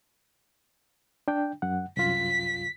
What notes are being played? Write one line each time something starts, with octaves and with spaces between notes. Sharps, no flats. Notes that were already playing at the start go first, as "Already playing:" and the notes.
D4 G5
F#2 F#5
C2 F#2 F4 B6